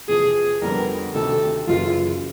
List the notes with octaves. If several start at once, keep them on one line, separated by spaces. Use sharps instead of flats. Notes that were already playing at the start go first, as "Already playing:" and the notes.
E2 C3 F3 G#4
F2 D3 G3 B3 A#4
D2 C3 D#3 A4
F#1 F#2 C#3 E3 F4